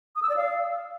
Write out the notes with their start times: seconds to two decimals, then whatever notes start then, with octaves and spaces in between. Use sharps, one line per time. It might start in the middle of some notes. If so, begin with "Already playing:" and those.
0.16 D#6
0.23 E6
0.29 D5
0.36 F5